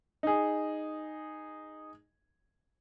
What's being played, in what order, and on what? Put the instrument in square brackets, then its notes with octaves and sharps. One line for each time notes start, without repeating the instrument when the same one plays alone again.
[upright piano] D#4 G#4